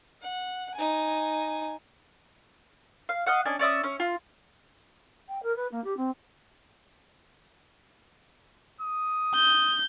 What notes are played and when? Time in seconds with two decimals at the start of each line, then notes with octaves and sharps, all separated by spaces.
0.21 F#5
0.75 D#4 G#5
3.09 F5
3.26 D#5 F5 F#5
3.45 C#4 D4 D#5 G#5
3.59 C#4 D5 E5 D#6
3.84 C#4
4.00 F4
5.28 G5
5.43 A#4
5.56 B4
5.72 A#3
5.84 G4
5.97 C4
8.81 D#6
9.34 G6